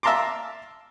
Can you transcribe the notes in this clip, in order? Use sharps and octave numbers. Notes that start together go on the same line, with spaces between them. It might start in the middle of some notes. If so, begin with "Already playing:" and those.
E5 F5 A5 A#5 C6 D6